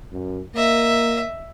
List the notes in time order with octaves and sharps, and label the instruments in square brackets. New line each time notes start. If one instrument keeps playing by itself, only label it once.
[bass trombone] F#2
[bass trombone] A#3 [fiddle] D#5 E5